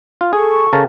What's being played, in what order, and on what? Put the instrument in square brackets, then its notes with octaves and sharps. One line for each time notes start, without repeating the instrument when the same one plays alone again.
[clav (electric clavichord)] F4
[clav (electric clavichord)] G#4 [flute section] A4 C#6
[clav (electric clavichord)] C#3 A#4 A5